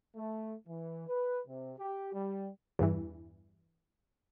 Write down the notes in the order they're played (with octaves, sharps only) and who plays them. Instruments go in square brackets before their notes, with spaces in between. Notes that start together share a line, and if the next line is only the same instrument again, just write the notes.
[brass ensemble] A3
E3
B4
C3
G4
G3
[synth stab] E2 G2 E3